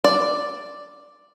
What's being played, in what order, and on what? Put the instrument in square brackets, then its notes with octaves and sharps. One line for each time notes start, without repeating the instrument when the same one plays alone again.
[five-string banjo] D5